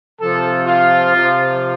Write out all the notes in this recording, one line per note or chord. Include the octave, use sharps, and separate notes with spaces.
C3 F3 A4
F4
C3 F3